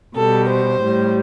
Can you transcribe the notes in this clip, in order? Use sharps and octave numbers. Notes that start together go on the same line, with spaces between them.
B2 G3 A4
C5
A2 G3